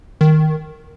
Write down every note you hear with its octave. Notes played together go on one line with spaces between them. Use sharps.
D#3